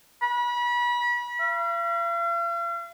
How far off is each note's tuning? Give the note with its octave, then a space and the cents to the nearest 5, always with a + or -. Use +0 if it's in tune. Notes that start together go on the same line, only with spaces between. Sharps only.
B5 -35
F5 -45